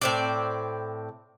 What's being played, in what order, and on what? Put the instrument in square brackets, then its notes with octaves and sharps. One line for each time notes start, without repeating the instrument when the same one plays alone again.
[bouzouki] A2 C4 D5